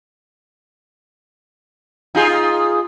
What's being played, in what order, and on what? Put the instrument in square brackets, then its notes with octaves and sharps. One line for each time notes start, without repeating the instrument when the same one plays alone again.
[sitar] D#4 F4 G#4